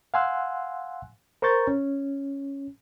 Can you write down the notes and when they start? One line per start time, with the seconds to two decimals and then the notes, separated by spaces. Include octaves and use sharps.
0.14 F5 F#5 G#5 C6 E6 F#6
1.42 A#4 C5 A#5 C#6 G6 A6
1.67 C#4